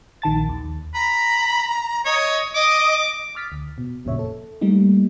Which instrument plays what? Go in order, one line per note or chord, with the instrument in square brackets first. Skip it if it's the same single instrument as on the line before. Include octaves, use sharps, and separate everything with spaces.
[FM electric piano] A#1 D#3 A5 A6
D#2
[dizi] A#5 [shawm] B5
[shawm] C#5 [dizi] D#5
[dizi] D#5 [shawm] D6
[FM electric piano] D6 D#6 F6 A6 B6
D2
B2
G1 F2 A#2 C#3 C#5 E5
A4
G3 A3 A#3 D#4